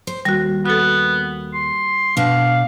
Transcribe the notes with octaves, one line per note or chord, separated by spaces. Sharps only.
C5
D#2 G3 F#4
B3 F#4 A4
C6
B2 D4 F5